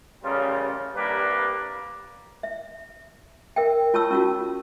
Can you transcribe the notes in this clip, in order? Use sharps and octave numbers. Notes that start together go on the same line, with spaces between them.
A1 C#3 G3 F4 G4 A#4
C2 G3 A#3 D4 B4
E5
A#4 E5 G5
F4 C#5 A5 C#6 E6
C#4 F4 F#4